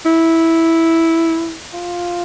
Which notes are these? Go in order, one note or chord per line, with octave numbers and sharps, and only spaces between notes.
E4
F4